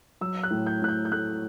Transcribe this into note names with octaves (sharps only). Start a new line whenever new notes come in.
F#3 E6
F#6
A2
G6
A2 F#6
G6
G6
A3 F#6